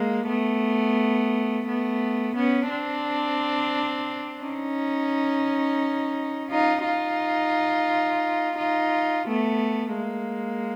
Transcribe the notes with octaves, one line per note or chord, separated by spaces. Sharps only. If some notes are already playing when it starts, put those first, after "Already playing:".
Already playing: G#3 A#3
A3 B3
A3 B3
B3 C#4
C4 D4
C#4 D#4
D#4 F4
D#4 F4
D#4 F4
A3 B3
G#3 A#3